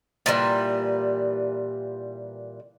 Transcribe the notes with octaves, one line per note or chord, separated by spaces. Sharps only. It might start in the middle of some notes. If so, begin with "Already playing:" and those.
A#2 E3 G3